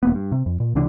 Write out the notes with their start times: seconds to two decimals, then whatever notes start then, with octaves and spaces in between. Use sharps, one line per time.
0.03 D#1 A#3 B3
0.15 G2
0.32 C3
0.46 F2
0.60 A#2
0.75 C#2 C3 E3 D4